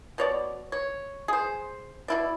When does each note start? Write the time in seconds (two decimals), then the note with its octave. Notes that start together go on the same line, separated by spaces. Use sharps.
0.18 B2 C#5 D5
0.72 C#5
1.28 G#4 C5
2.08 B2 E4 D5